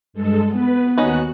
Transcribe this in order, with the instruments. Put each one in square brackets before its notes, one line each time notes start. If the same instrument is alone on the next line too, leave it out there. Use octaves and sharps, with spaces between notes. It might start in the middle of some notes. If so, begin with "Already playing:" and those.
[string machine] G2 G#3 A4
[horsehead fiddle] B3 [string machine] B4
[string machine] D#2 F#4 F#6 [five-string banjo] C#4 D#4 B4